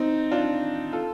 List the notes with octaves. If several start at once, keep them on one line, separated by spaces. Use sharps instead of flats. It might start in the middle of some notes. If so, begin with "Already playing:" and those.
Already playing: C4 D#4
D4 F4
F4 A4